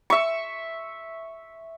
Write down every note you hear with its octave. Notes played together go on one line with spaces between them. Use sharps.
E5 C#6